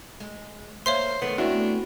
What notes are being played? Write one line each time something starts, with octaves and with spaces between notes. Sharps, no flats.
G#3
A#3 C5 C#5 E5 C6
D#3 A3 B3
A3 B3 C4 D4 E4 F#4